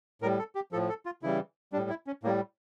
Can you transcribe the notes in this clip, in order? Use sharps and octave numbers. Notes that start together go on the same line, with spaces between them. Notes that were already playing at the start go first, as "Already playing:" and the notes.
A2 G3 A#4
A4
G4
A2 F3 A4
A4
F4
C#3 E3 G3 E4
A2 G3 D4
E4
C#4
A2 G3 A#3